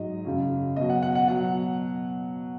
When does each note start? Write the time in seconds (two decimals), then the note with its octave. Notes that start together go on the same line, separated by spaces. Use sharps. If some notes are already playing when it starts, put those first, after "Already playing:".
Already playing: G#2 F#3 D#5
0.25 F#2 C#3 F#3
0.76 B2 F#3 D#5
0.90 F#5
1.02 F#5
1.15 F#5
1.28 B2 F#3 F#5